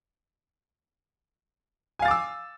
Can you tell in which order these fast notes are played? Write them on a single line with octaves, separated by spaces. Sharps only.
G#5 F5 A6 D6 E6